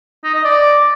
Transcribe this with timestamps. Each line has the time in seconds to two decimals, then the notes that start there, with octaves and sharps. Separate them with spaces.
0.24 D#4
0.34 D#5
0.44 D5